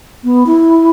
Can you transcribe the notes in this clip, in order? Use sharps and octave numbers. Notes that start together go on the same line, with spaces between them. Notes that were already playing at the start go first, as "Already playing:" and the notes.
B3
E4